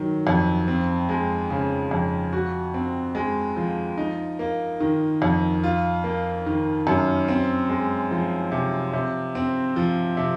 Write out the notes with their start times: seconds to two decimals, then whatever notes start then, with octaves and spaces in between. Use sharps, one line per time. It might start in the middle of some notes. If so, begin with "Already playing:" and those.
Already playing: D#3 F#3
0.27 F2
0.68 C4
1.09 G#3
1.50 C#3
1.91 F2
2.33 F#4
2.74 C4
3.15 G#3
3.56 F3
3.98 D#4
4.39 A#3
4.80 D#3
5.22 F2
5.63 F4
6.04 A#3
6.46 D#3
6.87 F#2
7.28 C4
7.69 G#3
8.11 F3
8.52 C3
8.93 C3
9.35 C4
9.76 F3
10.17 C3